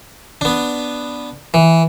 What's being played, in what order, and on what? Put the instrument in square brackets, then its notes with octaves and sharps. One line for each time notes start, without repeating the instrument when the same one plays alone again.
[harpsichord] B3 D4
E3